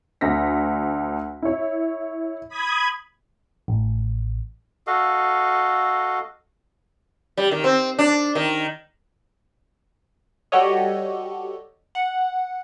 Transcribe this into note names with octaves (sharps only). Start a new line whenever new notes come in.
D2 A#6 B6
E4 C#5
B5 D#6 G#6
A1
F#4 A4 D#5 F5
G3
D#3
C4
D4
D#3
G3 F#4 G4 A4 C#5 D#5
F#5